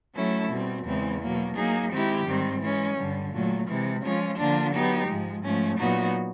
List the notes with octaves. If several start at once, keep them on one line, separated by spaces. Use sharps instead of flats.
F#3 A3 C#4 E4 A4
B2 G3 C4
E2 C#3 E3 G#3 C4
B2 F#3 A#3
F#3 A#3 D#4 G#4
D#3 G#3 C4 E4 G4
G#2 D#3 G3 C4
E3 G#3 C#4
G2 D3 G3
A#2 F#3 A3
C3 E3 G#3
F3 G#3 C#4 F4
D3 F3 A#3 D4 F4
F#3 B3 D#4 G4
G#2 F3 G#3
G#2 F3 A3 C#4
A#2 F#3 B3 D#4 F#4